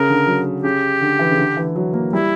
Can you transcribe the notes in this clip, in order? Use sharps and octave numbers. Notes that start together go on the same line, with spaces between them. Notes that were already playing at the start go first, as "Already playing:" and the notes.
Already playing: C#3 A#4
D3
F#3
C#3 G4
D3
E3
C#3
D3
E3
F#3
A#3
G3 E4